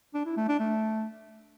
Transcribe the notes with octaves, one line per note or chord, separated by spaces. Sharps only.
D4
E4
A3
D4
A3